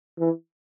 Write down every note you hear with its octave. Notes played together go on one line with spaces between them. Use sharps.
E3